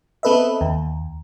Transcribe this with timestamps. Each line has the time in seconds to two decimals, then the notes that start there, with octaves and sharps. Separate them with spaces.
0.23 B3 C4 A4 B4 D#5 E5
0.61 D#2